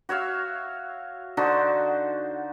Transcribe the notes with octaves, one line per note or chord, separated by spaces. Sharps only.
F#4 C#5 E5 F5
D3 D#4 F#4 C5